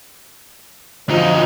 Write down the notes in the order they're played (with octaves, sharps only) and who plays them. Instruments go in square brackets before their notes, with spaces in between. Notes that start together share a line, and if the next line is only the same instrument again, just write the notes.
[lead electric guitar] D2 D#4 [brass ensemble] F3